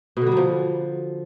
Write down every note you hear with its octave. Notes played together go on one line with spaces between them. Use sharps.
B2
D3
G3
F#3
F3